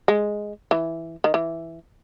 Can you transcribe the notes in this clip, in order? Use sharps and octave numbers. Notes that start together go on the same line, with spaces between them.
G#3
E3
D#3
E3